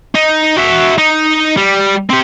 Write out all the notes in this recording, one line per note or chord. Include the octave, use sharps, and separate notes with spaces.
D#4
F#4 E5
D#4
G3
C4 G4